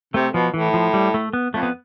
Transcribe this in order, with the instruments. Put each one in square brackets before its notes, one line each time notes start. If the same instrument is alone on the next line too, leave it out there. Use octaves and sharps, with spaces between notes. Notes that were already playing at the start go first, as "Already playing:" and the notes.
[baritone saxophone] C3 [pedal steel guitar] A3
[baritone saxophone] B2 [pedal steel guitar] F3
[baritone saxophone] A2 [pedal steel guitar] E3
[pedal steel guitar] F3
G3
A3
B3
[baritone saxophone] F2 [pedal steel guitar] A3
[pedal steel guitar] B3